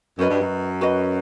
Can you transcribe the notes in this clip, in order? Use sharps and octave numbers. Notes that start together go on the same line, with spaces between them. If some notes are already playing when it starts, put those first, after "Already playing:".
F#2 F#4 B4 D#5
G2
F#2
F#4 B4 D#5